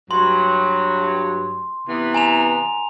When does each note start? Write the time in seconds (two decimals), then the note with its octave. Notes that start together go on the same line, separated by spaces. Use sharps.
0.11 G2 F#3 C6
1.88 C3 E3 B3
2.14 G#5 A#5 F7